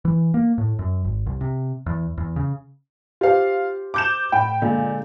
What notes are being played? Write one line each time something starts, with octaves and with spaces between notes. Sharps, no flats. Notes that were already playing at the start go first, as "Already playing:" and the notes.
E3
A#3
A2
F#2
G#1
C2
C3
E2
E2
C#3
F4 G4 C5 F5
D6 G6 E7
A2 F#5 G5 B5
A#2 D3 G#3